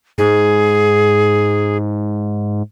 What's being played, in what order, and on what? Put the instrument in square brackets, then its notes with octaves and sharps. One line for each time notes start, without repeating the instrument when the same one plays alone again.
[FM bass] G#2 [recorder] G#4